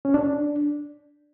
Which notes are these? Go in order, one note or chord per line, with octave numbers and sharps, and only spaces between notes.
C#4
D4